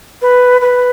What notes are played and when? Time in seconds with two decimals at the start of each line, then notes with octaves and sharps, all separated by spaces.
0.21 B4
0.61 B4